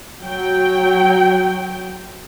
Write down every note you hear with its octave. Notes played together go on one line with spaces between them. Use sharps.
F#3 G5